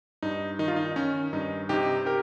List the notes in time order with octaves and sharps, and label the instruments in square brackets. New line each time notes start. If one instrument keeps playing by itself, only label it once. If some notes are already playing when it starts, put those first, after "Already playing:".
[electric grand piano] G2 D#4
D#3 D#4
F4
D#4
D#3 C#4
G2 D#4
C3 D#4 G4
G4 A#4